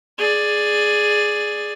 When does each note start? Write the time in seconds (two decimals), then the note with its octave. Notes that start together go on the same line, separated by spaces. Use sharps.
0.18 G#4 D5